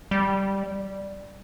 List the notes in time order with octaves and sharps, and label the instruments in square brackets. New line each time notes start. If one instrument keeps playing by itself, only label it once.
[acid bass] G3